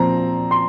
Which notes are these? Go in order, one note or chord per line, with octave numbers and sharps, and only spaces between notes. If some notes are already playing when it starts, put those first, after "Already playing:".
Already playing: A#2 F3 C4 A#5
C6